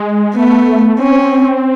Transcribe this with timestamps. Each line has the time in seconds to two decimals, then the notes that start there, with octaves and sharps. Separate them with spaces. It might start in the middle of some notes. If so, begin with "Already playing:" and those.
Already playing: G#3
0.35 A3 B3
0.99 C4 C#4